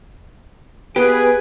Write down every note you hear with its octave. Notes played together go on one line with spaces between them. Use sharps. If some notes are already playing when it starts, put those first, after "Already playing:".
A#3 B3 G4 G#4 B4